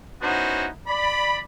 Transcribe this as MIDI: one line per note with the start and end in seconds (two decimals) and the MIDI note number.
0.22 0.67 59
0.22 0.67 61
0.22 0.67 63
0.22 0.67 64
0.22 0.67 66
0.22 0.67 72
0.87 1.39 74
0.87 1.39 83